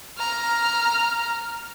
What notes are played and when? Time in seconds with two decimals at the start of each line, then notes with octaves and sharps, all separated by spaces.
0.18 A#5 F6